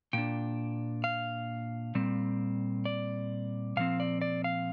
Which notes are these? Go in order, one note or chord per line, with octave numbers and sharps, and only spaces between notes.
A#2 A#3 D4 G5
F5
A#2 G3 C4
D5
A#2 F3 C4 F5
D5
D5
F5